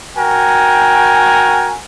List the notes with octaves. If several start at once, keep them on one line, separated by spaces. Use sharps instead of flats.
F#4 A#4 G5 G#5